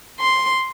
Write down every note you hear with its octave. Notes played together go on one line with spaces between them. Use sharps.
C6